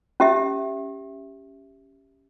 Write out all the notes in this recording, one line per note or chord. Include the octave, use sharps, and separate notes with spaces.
C#4 G4 E5